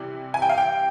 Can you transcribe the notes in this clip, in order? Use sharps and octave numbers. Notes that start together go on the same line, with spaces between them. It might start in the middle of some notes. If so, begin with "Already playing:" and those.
Already playing: C3 E3 G3
G#5
G5
F5
G5